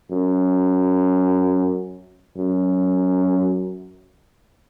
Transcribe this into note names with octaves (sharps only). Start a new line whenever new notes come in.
F#2
F#2